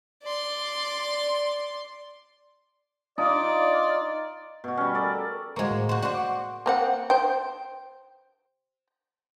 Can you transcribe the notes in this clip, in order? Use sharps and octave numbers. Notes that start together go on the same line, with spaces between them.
D5 C6
D#4 F4 D5
B2 F#4
G3 C#4
A4 A#4 D5
G#3 A#3 F#4 C5 C#6
A2
F#4 C5
F#4 C5 D5
C#6 D6
A#3 C4 F#5
C5 G5